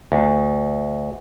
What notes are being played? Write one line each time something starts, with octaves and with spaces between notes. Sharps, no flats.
D2